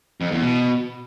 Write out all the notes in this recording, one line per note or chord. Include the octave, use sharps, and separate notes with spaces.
F2
E2
B2